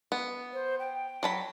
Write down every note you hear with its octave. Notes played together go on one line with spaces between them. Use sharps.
B3
C5
G5
F#3 A5 B5